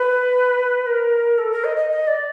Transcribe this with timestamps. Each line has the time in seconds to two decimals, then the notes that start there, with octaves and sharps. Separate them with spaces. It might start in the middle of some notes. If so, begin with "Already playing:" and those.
Already playing: B4
0.86 A#4
1.38 A4
1.51 A#4
1.64 D#5
1.77 D#5
1.90 D#5
2.07 D5